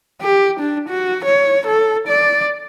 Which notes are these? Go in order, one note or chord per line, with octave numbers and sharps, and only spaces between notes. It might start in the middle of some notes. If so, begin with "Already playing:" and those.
G4
D4
F#4
C#5
A4
D5